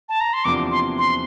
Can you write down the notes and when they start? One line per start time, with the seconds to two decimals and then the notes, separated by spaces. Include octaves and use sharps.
0.09 A5
0.21 A#5
0.33 C6
0.45 E2 C3 F3 A#3 D4 D6
0.71 C6
0.98 C6